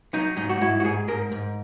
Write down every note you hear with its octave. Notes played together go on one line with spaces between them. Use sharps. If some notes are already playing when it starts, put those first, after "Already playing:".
F#3 D#4
G#2 D#4
F#4
G#2 E4
F#4
G#2 G#4
G#2 A#4
G#2